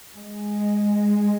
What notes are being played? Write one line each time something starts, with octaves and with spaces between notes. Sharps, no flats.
G#3